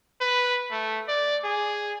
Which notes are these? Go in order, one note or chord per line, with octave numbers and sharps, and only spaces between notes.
B4
A3
D5
G#4